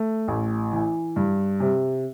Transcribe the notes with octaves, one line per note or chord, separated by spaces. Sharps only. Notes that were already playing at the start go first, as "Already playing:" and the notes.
Already playing: A3
A1
E3
G2
C3